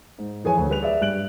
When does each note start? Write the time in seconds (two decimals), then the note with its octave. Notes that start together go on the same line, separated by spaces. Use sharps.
0.18 G#2
0.44 F2 E3 G#4 B4 C#5 G#5
0.57 D2
0.69 G3 B4 F7
0.82 G#4 D5 E5
1.01 G2 G3 F#6 D7 F#7